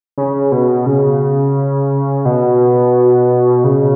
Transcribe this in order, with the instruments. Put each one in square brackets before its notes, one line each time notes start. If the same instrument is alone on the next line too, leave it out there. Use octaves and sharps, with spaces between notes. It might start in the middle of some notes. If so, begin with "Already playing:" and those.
[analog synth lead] C#3
B2
C#3
B2
C#3